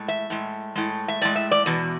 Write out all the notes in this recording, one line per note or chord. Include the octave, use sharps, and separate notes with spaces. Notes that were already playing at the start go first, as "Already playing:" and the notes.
Already playing: A2 G#3
E5
A2 G#3
A2 G#3
E5
A2 G#3 D5
E5
D5
E2 B2